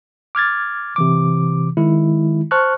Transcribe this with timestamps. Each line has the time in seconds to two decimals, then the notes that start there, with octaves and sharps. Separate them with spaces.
0.35 D6 F6 G#6 A6
0.96 C3 E3 D6
1.77 D#3 G#3 E4
2.51 C5 A5 C#6 F6 F#6